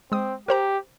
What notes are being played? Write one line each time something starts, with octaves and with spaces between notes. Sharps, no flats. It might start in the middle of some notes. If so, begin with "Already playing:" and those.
G#3 C4 D#6
G4 A#4 C5 A#5